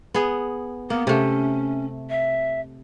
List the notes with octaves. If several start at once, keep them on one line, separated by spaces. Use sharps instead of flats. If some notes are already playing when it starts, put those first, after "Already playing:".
B3 G#4
A#3 B3
C3 A3 C#4
E5